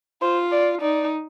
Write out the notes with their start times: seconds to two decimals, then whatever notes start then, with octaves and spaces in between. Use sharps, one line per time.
0.22 F4 C5
0.52 D5
0.81 D#4 D5